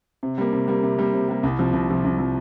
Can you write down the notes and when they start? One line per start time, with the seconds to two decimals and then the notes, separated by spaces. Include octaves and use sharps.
0.23 C3
0.38 G3 A#3
0.53 C3
0.68 G3 A#3
0.83 C3
0.99 G3 A#3
1.14 C3
1.29 G3 A#3
1.43 C2
1.59 C3 F3
1.73 C2
1.89 C3 F3
2.04 C2
2.19 C3 F3